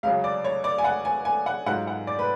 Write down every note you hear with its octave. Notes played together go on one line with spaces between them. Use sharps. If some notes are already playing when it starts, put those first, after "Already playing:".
C#2 C#3 F#3 F5
D5
C#5
D5
G#5
F#5
G#5
G#5
F#5
G#2 F#3 C#4 F4 F#5
F#5
D5
B4